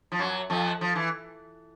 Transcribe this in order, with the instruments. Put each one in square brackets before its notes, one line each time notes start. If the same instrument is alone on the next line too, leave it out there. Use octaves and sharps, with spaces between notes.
[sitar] F3
F#2 F#3
F2 F3
F3
E3